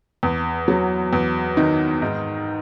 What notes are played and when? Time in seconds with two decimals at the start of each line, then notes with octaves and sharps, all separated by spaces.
0.23 E2
0.68 F#3
1.13 E2
1.57 D#3
2.02 G#2